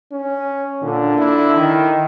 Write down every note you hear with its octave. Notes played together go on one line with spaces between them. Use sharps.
C#4
A#2 D3
E4
D#3